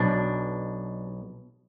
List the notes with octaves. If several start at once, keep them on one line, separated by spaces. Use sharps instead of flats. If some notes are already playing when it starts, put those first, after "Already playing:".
Already playing: B1 B2 D4